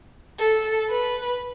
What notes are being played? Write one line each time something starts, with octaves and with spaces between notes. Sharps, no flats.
A4
B4